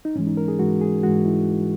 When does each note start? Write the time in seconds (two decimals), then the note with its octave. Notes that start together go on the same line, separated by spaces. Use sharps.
0.05 D#4
0.15 G#2 E3 G#3 C#4
0.27 D#4
0.37 A#4
0.48 G#4
0.59 G#2 E3 G#3 F#4
0.81 G#4
1.03 G#2 E3 G#3 F#4
1.25 E4